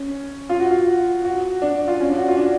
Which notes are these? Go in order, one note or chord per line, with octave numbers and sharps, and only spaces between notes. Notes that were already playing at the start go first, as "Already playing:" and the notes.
Already playing: C#4
F4
F#4
F4
F#4
D4
F4
C#4
D4
F#4
F4
D4